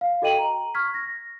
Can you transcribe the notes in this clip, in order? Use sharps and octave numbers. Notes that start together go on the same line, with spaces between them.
F5
F#4 A4 D#5 G5 D#7 F#7
A#5
C#6 F6 G#6 B6
A#6